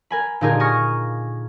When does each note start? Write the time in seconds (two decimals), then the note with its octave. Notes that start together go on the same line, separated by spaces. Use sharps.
0.10 A#4 G#5 B5
0.41 A#2 D3 D#4 G4 G#4 A#4
0.60 G#5 C#6 D#6 F6 A#6